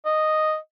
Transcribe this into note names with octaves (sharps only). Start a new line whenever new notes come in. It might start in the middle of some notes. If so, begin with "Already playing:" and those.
D#5